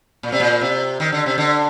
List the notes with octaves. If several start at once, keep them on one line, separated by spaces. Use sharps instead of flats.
A#2
C3
A#2
C3
D#3
D3
C3
D3